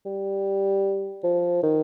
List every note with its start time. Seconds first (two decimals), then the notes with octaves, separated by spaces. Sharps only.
0.06 G3
1.24 F3
1.63 D#3